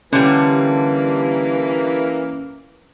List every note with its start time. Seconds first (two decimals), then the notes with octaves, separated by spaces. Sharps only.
0.13 D3 E3 G3 A#3 C#4